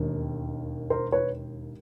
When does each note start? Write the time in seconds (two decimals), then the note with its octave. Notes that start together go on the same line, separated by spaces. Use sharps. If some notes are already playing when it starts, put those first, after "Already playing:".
Already playing: E1 D#2 D#3
0.90 A#4 C5
1.12 B4 C#5